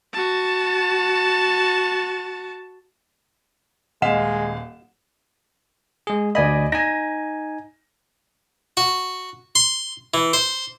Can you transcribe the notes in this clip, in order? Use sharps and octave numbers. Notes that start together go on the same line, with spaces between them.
F#4 A5
D#1 G#3 D#5 F5 F#5 E7
G#3 G#4
D2 D5 D#5 G#5 B5
D#4 G#5 A#6
F#4
C6
E3
C5